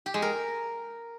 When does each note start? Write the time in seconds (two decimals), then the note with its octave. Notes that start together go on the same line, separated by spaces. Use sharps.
0.06 G4
0.14 G#3
0.22 A#4